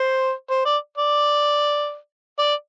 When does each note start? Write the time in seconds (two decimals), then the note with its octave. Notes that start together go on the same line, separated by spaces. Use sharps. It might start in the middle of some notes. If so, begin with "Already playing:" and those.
Already playing: C5
0.50 C5
0.65 D5
0.97 D5
2.39 D5